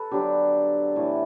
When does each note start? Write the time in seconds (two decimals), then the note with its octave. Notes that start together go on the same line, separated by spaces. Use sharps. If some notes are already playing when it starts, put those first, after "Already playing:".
Already playing: A4 B4
0.11 D3 F#3 B3 D4 G4
0.96 A2 E3 A3